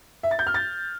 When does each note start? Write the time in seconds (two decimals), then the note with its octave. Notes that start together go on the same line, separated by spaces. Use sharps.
0.23 E5
0.31 A6
0.39 G6
0.47 F6
0.54 A6